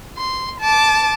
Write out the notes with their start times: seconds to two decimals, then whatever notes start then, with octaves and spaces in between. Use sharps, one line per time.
0.18 C6
0.60 A5 D6